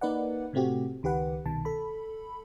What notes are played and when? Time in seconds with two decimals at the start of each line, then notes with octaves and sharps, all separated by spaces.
0.01 A#3 D#4 B4 D5 F#5
0.53 A2 C3 A3 C4 F#4 G4
1.03 C#2 D#3 G4 B4 F#5
1.46 C2 B2 D#3 A5
1.65 A4 B5